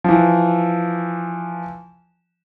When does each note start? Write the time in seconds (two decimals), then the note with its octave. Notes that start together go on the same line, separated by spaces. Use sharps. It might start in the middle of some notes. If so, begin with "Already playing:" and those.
0.04 E3 F3